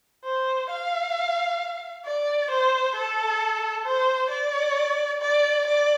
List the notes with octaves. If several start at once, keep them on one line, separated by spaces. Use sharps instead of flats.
C5
F5
D5
C5
A4
C5
D5
D5
D5